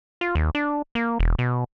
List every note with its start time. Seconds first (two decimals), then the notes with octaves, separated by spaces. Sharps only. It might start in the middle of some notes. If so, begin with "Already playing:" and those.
0.21 F4
0.35 D#2
0.55 D4
0.95 A#3
1.20 E1
1.39 B2